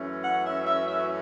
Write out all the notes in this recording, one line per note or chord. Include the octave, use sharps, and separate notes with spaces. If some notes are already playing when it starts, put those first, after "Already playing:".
Already playing: F#2 E3 A3 C#4
F#5
E5
E5
E5